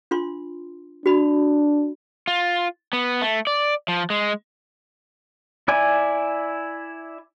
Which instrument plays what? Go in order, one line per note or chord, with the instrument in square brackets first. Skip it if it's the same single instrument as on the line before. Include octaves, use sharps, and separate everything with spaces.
[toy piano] D4 F4 C6
[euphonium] D4 [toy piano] F#4 B5
[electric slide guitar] F4
B3
A3
D5
F3
G#3
[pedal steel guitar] E4 D5 G#5